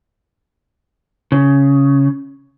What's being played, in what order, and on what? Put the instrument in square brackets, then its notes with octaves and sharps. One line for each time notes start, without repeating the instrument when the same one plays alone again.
[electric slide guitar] C#3